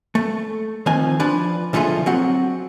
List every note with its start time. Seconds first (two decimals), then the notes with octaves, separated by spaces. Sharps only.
0.15 A3
0.86 D#3 F3 C4 G#5
1.20 F3 D4 B4
1.73 B1 D3 F3 A3 F4 G#4
2.06 F#3 C4 F#5